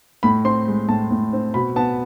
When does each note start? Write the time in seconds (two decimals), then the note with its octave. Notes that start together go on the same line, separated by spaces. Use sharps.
0.23 A2 B5
0.45 C4 C6
0.68 G#3
0.89 A2 A5
1.11 A2
1.33 C4
1.54 B2 B5
1.76 B3 A5